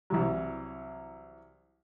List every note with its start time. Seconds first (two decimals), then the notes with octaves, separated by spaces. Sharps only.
0.10 C2 E3 F#3